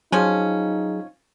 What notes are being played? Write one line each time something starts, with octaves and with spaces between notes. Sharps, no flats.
F3 F#3 C#4 D#4 G#4